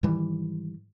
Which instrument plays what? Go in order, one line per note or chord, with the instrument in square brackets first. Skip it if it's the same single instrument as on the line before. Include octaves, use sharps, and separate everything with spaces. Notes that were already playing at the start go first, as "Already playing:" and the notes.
[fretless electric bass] G#2 D#3 E3 G3